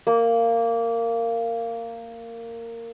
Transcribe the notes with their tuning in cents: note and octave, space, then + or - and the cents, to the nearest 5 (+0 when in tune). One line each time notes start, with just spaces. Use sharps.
A#3 -15